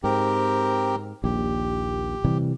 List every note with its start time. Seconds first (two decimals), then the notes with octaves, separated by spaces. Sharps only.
0.04 G#2 C4 G4 A#4
1.24 A#1 D#2 G4
2.25 C3 E3 G3